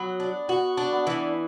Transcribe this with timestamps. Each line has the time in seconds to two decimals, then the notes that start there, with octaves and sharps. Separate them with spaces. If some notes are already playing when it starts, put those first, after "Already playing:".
Already playing: F#3 B3
0.20 D4
0.49 B3 F#4
0.77 D4
0.92 B3
1.07 E3